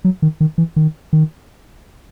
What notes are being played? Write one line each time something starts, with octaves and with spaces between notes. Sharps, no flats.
F#3
D#3
D#3
E3
D#3
D#3